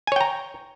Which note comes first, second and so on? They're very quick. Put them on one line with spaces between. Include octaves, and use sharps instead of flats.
G#5 C#5 G5 A#5